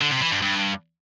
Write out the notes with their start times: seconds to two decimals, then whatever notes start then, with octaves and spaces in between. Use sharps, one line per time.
0.01 D3
0.11 C3
0.21 E3
0.32 G2
0.42 G2